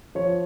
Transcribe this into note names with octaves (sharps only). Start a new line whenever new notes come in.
F3 C#5